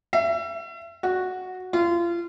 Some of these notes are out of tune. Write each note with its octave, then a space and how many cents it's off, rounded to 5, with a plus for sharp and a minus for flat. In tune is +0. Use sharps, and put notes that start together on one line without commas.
E5 +35
F#4 -5
F4 -30